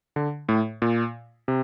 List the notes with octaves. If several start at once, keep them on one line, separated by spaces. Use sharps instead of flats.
D3
A2
A#2
C3